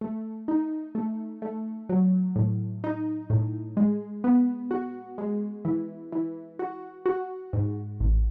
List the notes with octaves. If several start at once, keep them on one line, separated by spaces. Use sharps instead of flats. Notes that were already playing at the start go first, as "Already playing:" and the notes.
A3
D#4
A3
A3
F#3
A2
D#4
A2
G#3
B3
F#4
G#3
E3
E3
F#4
F#4
G#2
A1